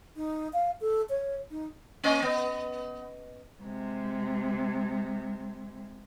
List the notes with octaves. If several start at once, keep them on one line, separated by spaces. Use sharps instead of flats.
D#4
F5
A4
C#5
D#4
A#3 C#4 D#5
B3
C3 G#3